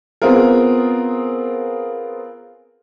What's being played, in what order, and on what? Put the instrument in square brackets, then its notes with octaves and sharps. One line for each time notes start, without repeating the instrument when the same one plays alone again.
[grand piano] B3 C4 F4 G#4 A#4